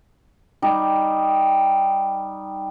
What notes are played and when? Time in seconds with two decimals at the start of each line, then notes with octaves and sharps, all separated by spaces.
0.62 G3 D#4